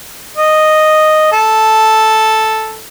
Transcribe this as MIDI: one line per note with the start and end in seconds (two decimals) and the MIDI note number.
0.36 1.31 75
1.32 2.77 69